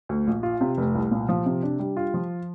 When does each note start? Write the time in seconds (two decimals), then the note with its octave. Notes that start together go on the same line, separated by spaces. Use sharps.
0.09 D2
0.27 A#1
0.43 F4
0.61 C3
0.77 F1
0.95 C2
1.12 A#2
1.29 F3
1.46 C3
1.63 D4
1.79 G3
1.97 F4
2.14 F3